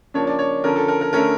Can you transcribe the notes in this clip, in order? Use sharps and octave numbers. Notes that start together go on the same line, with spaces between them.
C#3 F3 A#3 D4 C#5
D5
C#5
D3 F3 C#4 A#4
A4
A#4
A#4
D3 A3 C#4 A#4